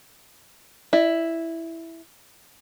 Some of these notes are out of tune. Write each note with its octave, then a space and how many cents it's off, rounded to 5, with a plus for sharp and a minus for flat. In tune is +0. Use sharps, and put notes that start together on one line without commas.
E4 +0 D5 +40